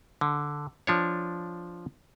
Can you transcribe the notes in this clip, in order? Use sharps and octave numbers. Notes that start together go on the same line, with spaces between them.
D3
F3 D4 C#5